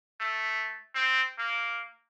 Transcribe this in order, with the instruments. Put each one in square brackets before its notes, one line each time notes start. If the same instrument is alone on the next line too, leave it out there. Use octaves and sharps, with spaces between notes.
[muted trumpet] A3
C4
A#3